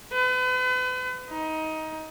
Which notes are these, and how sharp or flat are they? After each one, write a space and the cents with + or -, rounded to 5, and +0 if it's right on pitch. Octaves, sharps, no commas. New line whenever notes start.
B4 +40
D#4 +20